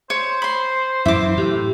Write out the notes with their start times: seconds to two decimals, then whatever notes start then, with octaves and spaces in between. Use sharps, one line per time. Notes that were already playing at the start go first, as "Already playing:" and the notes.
0.10 C5 C#5
0.42 B5 C6
1.06 F#2 E3 E4 E5 D6
1.37 A2 G4